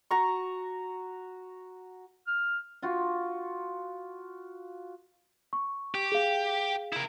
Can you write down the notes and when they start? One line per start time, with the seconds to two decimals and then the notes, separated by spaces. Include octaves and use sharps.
0.11 F#4 A#5 C#6
2.27 F6
2.82 F4 F#4
5.53 C#6
5.95 G4
6.12 G#4 F5
6.93 E4 A#4